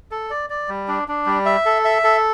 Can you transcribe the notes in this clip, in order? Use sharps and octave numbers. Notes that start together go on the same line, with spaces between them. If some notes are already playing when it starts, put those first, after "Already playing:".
A4
D5
D5
G3
D4
D4
G3
E5
A4
E5
A4